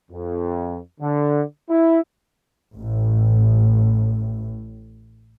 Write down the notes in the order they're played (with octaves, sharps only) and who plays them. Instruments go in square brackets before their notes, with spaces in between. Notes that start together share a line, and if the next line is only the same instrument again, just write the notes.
[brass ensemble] F2
D3
E4
[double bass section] A1 A2